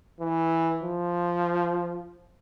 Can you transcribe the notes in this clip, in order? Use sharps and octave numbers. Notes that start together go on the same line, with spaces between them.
E3
F3